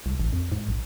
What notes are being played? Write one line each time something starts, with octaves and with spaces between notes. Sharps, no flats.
C2
A1
F2
G#2
A#1